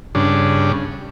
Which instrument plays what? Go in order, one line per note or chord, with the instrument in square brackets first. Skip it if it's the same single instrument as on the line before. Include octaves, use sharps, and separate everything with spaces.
[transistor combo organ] G2 C#3 D4